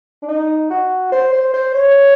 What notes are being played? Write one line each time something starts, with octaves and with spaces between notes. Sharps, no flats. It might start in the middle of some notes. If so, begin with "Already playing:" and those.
D4
D#4
F#4
C5
C5
C5
C#5